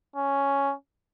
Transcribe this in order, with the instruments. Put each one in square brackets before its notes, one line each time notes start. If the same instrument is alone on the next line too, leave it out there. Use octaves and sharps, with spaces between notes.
[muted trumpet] C#4